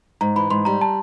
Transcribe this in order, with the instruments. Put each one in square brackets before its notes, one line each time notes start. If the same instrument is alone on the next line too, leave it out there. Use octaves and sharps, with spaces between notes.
[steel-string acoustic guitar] G#2 [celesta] A#5
[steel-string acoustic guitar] E3 [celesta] B5
[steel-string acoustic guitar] G#2 [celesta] C6
[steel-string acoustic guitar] G3 [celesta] A#5
[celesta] A5